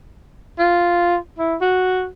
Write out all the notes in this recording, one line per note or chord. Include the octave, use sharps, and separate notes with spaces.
F4
E4
F#4